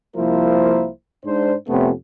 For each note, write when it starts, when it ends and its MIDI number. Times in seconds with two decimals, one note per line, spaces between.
0.15 0.88 36
0.15 0.88 53
0.15 0.88 58
0.15 0.88 64
0.15 0.88 70
0.15 0.88 72
1.25 1.53 44
1.25 1.53 62
1.25 1.53 72
1.68 1.90 41
1.68 1.90 48
1.68 1.90 57
1.68 1.90 59
1.68 1.90 61